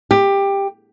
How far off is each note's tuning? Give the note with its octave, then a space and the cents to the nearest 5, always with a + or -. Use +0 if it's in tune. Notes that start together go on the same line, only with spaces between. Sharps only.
G4 +15